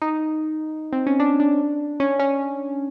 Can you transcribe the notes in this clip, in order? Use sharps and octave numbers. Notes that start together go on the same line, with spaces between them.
D#4
C4
C#4
D4
D4
C#4
C#4